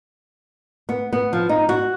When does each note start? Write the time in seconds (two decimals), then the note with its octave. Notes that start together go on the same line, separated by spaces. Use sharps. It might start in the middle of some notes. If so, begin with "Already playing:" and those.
0.89 B3
1.13 B3
1.33 F3
1.49 D#4
1.69 F#4